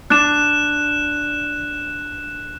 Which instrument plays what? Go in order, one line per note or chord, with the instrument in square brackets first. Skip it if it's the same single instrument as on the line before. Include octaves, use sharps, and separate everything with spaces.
[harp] D4 [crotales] F#6 E7